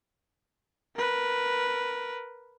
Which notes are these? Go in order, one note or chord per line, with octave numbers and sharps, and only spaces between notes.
A#4 B4